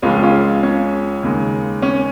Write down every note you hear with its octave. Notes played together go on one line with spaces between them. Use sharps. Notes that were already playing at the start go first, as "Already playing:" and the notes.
C#2 C#3 F3 G#3 C#4 F4
C#4 F4
C#4
D#2 C#3 G#3
C#4